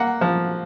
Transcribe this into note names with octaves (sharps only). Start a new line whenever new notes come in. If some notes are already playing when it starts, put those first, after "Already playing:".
Already playing: A#3 F#5
F3